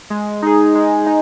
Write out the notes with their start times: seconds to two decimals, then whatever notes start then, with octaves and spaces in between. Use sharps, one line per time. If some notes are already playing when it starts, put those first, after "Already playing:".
0.10 G#3
0.42 D#4 G#4
0.75 G#3
1.07 D#4